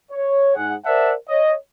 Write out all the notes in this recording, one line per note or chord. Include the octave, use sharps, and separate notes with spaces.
C#5
G#2 G#4 F#5
A#4 C5 D5 E5 F#5 A5
C#5 D#5